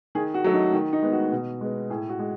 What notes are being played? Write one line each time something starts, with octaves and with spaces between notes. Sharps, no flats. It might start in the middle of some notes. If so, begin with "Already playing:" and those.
D#3 G#4
F#4
F#3 A3
D#4
D#3
D#4
G#3 B3
F#4
B2
G#3 B3
A2 G#4
F#4
G#3